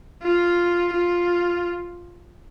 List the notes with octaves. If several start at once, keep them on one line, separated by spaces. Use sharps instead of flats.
F4
F4